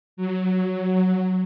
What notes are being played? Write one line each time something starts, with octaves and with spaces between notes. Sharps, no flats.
F#3